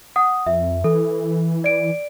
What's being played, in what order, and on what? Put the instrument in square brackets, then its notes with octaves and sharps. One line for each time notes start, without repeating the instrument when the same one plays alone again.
[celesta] F#5 D#6
[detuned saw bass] F2 [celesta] E5
[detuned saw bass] E3 [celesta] A4
[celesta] D5 D7